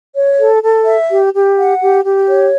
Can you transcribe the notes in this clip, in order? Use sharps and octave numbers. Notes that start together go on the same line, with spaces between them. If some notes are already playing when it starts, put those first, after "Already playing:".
C#5
A4
A4
E5
G4
G4
F#5
G4
G4
C#5